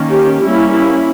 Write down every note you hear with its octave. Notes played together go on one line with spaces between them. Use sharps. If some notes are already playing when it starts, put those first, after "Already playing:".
Already playing: D#3 A#3 C#4
G4
G3 A#3 C#4 E4
E4